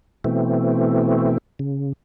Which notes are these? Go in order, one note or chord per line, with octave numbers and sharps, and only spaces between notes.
B2 E3 A3 C4
C#3